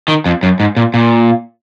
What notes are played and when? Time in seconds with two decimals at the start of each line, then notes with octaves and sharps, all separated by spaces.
0.08 D#3
0.26 F2
0.43 F#2
0.60 G#2
0.77 A#2
0.94 A#2